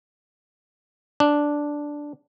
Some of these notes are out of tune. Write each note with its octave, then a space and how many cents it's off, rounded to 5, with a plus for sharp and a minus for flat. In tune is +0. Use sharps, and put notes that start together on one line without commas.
D4 -5